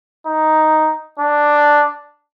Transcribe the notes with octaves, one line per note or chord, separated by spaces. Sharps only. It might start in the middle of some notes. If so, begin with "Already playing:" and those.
D#4
D4